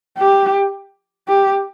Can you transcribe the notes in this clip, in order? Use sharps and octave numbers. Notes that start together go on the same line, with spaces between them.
G4
G4